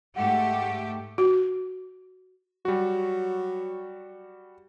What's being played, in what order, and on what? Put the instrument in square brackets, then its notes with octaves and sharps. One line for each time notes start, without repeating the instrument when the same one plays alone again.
[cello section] G#2 A3 G4 [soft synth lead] F#5
[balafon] F#4
[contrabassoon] F#3 [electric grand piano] G3 F#4